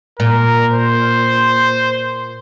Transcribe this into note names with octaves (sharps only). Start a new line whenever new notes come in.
A#2 A#4
C5